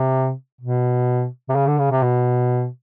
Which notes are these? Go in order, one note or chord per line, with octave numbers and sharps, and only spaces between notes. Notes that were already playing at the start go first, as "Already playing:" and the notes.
Already playing: C3
B2
C3
C#3
D3
C#3
C3
B2